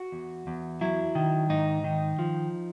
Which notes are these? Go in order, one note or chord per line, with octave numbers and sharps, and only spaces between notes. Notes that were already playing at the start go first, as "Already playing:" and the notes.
Already playing: F#4
E2
E2
F#3 E4
D#3
G#2 D#4
D#3
F3